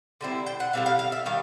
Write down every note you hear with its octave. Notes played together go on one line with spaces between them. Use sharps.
D3 G3 C4 E4
G5
F#5
D3 G3 C4 E4 F5
F5
F5
E5
D#3 G3 F5